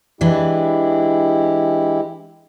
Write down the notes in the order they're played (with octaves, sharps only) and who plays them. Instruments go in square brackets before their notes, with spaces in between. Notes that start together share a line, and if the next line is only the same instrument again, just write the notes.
[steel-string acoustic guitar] E3 D4 [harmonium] G#3 E4 G4